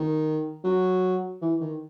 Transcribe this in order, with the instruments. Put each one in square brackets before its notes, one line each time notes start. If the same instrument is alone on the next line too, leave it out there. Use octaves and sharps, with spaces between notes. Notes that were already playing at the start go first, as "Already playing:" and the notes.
Already playing: [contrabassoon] D#3
F#3
E3
D#3